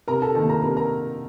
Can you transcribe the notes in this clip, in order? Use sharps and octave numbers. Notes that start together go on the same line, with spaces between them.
C3 A#4 A#5
A4 A5
D#3 A#3 A4 A5
A#4 A#5
C3 A#4 A#5
A#4 A#5